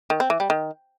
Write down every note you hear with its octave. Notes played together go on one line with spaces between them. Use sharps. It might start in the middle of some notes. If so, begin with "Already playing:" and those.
D#3
C4
E3
G3
D#3